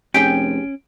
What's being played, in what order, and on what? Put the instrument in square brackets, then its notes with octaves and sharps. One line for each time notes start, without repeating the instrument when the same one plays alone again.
[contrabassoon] F1 [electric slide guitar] C#4 [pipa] G4 G#4 G5 [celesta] D7